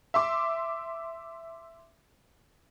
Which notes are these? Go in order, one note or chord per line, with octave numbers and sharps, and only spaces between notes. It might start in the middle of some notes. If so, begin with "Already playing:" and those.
E5 C6 D6